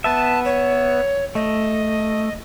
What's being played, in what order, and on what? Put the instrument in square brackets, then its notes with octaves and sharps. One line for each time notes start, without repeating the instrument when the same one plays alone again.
[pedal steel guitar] B3 B4 E5 [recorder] A5
[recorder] C#5
[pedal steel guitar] A3 [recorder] D#5